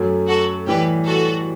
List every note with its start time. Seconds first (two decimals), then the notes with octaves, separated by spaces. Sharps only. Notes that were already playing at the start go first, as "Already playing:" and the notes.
Already playing: F#2 F#3 A3
0.28 F#4 A4
0.67 A2 E3 G3 G4 B4
1.06 F#4 A4